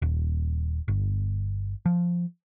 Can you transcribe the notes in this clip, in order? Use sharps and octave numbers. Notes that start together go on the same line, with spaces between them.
D#1
G1
F3